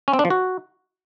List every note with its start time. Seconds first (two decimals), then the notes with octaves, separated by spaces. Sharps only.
0.08 C#4
0.13 C4
0.19 D4
0.25 F3
0.30 F#4